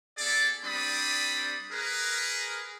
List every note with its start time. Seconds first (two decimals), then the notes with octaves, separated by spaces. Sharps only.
0.18 B3 E4 G#4 A4 D5
0.65 G3 C4 D4 D5 B5 D#6
1.72 G#4 A#4 B4